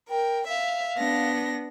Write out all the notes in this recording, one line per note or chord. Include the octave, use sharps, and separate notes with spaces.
A#4 G5
E5 F5
B3 D4 A#6